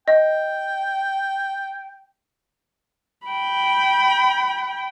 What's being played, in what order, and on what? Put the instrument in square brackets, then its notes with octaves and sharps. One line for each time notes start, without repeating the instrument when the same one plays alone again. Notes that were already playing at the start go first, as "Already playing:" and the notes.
[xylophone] D#5 [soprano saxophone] G5
[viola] G5 B5